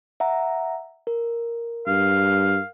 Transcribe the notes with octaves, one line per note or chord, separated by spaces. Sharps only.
E5 F#5 A#5
A#4
G2 F5